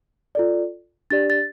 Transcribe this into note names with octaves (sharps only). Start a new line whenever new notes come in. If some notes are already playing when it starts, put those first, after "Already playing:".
F4 A4 D5
D4 G4 D5 A6
A6